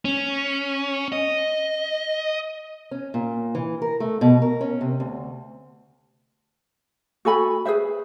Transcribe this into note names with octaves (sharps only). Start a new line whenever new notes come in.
C#4
D#5
C#4
A#2
E3
A#4
A3
B2
A#4
C#4
C3
D2
F#4 A4 G#5 B5
G#4 B4 C5 E5